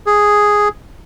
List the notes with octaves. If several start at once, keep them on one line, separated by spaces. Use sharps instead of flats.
G#4